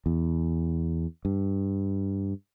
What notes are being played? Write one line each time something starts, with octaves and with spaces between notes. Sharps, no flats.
E2
G2